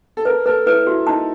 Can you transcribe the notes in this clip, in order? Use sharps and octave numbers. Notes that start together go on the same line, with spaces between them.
A4
A#4 B4
A4 B4
E4 B4
E4 F#4
D#4 A5